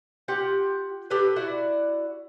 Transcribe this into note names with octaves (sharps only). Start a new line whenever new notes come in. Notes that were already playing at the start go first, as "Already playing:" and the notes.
F4 G4 F#5
G4 A4 B4
E4 F#4 D5 F#5